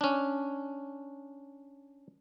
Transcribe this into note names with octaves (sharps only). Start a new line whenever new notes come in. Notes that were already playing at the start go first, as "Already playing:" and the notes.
C#4 D4